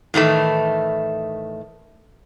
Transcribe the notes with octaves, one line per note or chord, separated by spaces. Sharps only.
A2 D#3 E3 A3